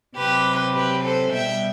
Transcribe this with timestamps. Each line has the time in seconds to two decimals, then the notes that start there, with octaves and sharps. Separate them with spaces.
0.16 C3 F#3 G4 B4
0.74 G4 B4
1.03 A4 C5
1.32 B2 G3 E5 G5